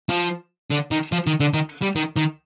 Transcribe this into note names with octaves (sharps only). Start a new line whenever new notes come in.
F3
D3
D#3
F3
D#3
D3
D#3
G3
D#3
D#3